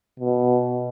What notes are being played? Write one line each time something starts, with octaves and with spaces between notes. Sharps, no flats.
B2